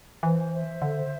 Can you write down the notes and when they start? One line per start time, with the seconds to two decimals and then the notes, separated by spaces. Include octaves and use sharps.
0.23 E3 C5
0.52 C5 E5
0.82 D3